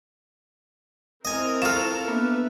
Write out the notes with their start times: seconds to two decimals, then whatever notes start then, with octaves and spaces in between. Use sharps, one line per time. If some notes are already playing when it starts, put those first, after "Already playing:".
1.25 C4 E4 A#4 D#5 G#5
1.62 F4 A4 C#6 F6 E7
2.08 A#3 B3 D4 B4 E5